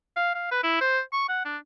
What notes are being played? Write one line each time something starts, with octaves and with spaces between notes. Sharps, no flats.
F5
F5
B4
E4
C5
C#6
F#5
D4